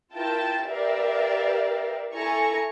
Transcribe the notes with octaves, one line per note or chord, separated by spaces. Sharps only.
E4 F4 A#4 G5 A5
G4 A#4 B4 D5 E5 F5
E4 A4 G#5 A#5 C#6